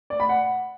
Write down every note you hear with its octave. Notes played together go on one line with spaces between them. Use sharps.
D5
B5
F#5